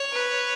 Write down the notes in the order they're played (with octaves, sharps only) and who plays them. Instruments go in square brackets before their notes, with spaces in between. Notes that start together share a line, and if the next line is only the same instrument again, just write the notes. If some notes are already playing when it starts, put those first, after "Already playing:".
Already playing: [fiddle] C#5
[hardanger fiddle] B4